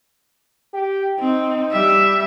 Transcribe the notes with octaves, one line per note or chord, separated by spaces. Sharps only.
G4
C4 D#4
G3 E5